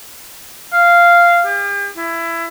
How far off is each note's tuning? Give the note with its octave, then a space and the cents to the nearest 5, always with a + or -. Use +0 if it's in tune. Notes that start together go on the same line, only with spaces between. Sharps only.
F5 -10
G4 +45
E4 +20